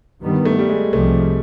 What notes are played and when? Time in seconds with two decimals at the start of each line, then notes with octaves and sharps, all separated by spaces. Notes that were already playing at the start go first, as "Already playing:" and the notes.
0.22 G2 D#3 G3 B3
0.45 A3
0.59 G3
0.69 G#3
0.93 C2 C3 F3 A3